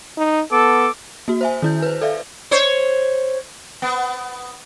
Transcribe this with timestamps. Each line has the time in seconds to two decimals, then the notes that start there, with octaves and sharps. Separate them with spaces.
0.18 D#4
0.52 B3 A4 D6
1.28 A#3 F#4
1.41 C5 E5 G#5
1.62 D#3 E4 G6
1.82 B4 C5
2.01 A4 D5 E5 F5
2.51 C5 C#5
3.82 B3